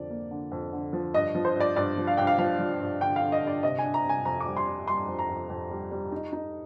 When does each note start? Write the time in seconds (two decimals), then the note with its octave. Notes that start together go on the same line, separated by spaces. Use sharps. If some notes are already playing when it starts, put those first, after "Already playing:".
Already playing: F2 D3 D5
0.10 A#3
0.31 D3
0.52 F2
0.73 D3
0.93 F3
1.14 G2 D#5
1.35 F3
1.45 C5
1.55 G2
1.60 D5
1.76 G2 D5
1.97 F3
2.07 F5
2.17 G2 G5
2.27 F5
2.38 F3 F5
2.59 F3
2.80 G2
3.00 D3 G5
3.16 F5
3.21 D3
3.32 D#5
3.42 G2 D5
3.63 C3 D#5
3.79 D4 G#5
3.94 A#5
4.05 C3 G#5
4.25 F2 A#5
4.41 D6
4.46 G3
4.57 C6
4.67 D4
4.87 G3 C6
5.08 F2
5.19 A#5
5.29 F2
5.50 F2
5.71 G3
5.91 G3
6.12 D#4
6.33 D#4